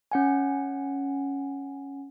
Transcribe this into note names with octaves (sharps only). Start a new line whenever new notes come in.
C#4 F#5 G#5